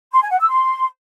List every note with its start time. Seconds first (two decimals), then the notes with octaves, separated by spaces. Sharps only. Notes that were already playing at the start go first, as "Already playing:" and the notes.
0.13 C6
0.22 G#5
0.31 F#5
0.40 E6
0.49 C6